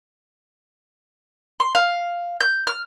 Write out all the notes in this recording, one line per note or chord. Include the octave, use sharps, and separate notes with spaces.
C6
F5
G6
F6